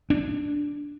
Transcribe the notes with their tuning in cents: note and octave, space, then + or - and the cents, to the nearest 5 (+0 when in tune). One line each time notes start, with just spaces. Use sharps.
D4 -10